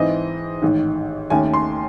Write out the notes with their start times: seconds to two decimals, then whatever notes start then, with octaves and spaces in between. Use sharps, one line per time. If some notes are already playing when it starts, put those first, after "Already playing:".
Already playing: G#2 E3 C4 D#5
0.62 A1 G#2 D#3
1.30 D#2 D#3 A3 C#4 G#5
1.54 C6